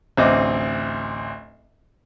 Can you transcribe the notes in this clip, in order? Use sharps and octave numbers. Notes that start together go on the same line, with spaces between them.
A1 D2 C4 D#5 D6